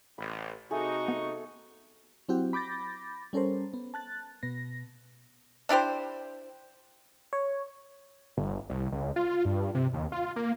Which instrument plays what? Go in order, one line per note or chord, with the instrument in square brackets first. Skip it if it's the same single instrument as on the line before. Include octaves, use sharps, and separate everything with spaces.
[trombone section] A1 [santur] B5
[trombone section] C3 D#4 [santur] A3 G#4 [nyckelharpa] F#4 C#6
[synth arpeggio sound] B3
[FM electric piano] F#3 C4 E4 F#4 G4
B5 D6 G6 A6 A#6
G3 C#4 A4 A#4 C5
B3
A5 F#6 A6
B2 B3 A#6
[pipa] D4 E4 G4 C5
[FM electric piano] C#5
[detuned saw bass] G1
C2
C#2
F4
G2
C3
D#2
F4
A#3